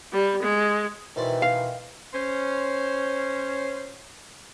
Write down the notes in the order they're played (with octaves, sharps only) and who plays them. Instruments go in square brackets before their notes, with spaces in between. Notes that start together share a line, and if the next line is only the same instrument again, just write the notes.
[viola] G3
G#3
[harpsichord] B2 C5 D5 [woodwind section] D#3 E3
[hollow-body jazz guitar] F5
[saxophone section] C#4 C5